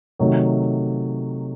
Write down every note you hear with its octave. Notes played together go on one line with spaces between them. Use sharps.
C3 D#3 F#3 A3